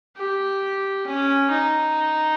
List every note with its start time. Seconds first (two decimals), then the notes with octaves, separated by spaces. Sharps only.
0.17 G4
1.06 C#4
1.51 D#4